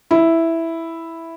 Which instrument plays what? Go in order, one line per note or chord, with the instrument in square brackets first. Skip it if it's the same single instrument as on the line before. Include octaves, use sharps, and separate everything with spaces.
[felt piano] E4